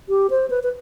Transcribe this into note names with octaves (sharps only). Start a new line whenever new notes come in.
G4
C5
B4
B4